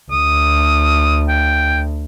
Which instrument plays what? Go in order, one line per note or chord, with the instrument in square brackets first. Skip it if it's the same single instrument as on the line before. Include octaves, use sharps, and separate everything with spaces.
[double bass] D2 [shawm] D#6
[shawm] G5